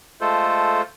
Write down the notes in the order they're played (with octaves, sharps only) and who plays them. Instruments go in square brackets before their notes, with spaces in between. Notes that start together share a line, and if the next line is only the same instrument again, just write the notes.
[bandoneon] G#3 A3 F4 A4 C5